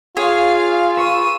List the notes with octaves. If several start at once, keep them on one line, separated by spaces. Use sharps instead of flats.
F4 G#4 C#5 F5
B4 C#6 E6 D#7